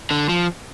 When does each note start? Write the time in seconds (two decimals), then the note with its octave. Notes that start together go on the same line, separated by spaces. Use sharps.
0.11 D3
0.29 F3